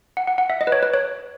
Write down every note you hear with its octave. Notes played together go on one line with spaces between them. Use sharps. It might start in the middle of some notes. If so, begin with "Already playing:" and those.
F#5
F#5
F#5
E5
D#5
B4
C#5
B4
C#5